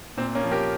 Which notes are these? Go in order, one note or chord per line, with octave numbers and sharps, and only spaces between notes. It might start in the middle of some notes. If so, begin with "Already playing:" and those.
A#2 C4
A#3 C#4
F3
G4 A#4